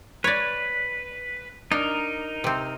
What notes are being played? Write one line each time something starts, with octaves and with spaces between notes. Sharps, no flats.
B4 C#5 D5
D4 D#4 A#4
C3 C4